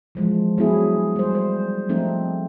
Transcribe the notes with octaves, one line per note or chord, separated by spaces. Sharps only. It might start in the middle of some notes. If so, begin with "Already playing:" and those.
E3 F3 G#3
F#3 B3 E4 G#4
G3 C5
C5
F3 A3 C4 D#4